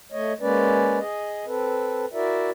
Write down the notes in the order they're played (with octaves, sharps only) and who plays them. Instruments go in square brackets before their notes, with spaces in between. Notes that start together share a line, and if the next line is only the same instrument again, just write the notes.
[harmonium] A3 C#5 D#5
G#3 A#3 C#4 B4 D5
G#4 D#5
C4 A4 B4
E4 F#4 A#4 D5 E5